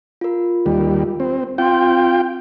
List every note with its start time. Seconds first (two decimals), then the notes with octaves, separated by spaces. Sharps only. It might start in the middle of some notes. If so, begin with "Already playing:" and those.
0.21 F4 A#4
0.66 D#2 G3
1.20 C4
1.58 C4 F4 G5 C6